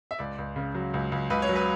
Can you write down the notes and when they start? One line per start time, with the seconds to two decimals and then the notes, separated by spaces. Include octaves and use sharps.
0.11 E5
0.19 C#2 D5
0.38 C#2
0.56 C#3
0.75 F#3
0.94 C#2
1.12 C#2
1.30 C#2 B4
1.42 C#5
1.49 F#3
1.56 B4